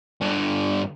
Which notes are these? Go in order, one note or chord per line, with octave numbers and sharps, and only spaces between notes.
G2 D3